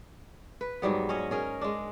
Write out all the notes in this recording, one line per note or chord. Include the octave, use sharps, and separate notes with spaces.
B4
G#2 F#3 G3 B3
C#4 C#5 D#5
C#4 G#4 A#4
G#3 D4